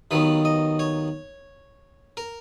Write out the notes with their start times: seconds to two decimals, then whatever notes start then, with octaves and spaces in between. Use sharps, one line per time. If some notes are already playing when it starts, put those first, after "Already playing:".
0.11 D#2 D#3 F#3 B3 B4
0.45 D#5
0.79 C#5
2.17 A#4